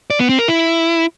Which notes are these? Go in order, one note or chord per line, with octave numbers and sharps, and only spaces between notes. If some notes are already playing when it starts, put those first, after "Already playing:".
D5
B3
C4
A#4
E4